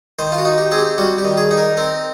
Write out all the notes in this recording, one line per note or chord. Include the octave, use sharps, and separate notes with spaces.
D#3 C5
F4
F#4
D#4
G4
C4 G#4
G4
G3 F#4
G4
D#3
G#4
D#4
A#4
C4 A#4